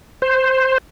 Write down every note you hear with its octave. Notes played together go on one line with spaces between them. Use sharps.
C5